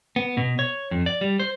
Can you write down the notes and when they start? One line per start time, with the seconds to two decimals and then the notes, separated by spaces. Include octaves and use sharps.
0.16 B3
0.37 B2
0.59 C#5
0.91 F2
1.06 D5
1.21 G3
1.40 C5